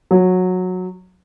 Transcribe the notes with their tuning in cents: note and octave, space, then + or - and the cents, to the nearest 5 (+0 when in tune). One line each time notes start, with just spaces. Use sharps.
F#3 -15